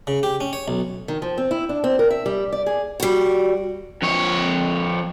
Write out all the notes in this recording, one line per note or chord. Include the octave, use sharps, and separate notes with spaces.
C#3
G4
C#4
C#5
B1
D#3
F3
C4
E4
D4
C4
A#4
E5
G3
D5
G#4
G3 F#4
F2 C#5